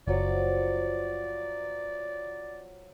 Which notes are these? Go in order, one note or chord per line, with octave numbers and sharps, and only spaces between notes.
F#1 F3 F#3 C#5 D5